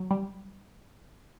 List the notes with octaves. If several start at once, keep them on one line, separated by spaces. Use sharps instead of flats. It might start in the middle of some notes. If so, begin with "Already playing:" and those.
Already playing: F#3
G3